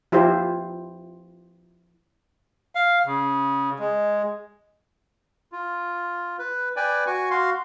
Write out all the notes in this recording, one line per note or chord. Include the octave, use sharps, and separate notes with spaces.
F3 E4 F4 G4 C5
F5
C#3
G#3
F4
B4
B4 D5 G5 G#5
F#4 G#5 C#6
F#4 F5 C6